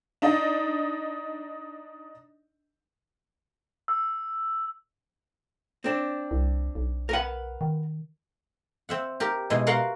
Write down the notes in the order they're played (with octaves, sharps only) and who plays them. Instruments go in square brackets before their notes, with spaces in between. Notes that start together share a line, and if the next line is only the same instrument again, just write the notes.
[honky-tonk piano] D4 D#4 D#5
[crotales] E6
[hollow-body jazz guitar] C4 D4
[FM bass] C2
B1
[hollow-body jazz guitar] A#4 B4 F#5
[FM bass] D#3
[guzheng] C4 E5 F#5
G4 A#4
B2 G#3 E4
F#4 A#4 F5 F#5 C6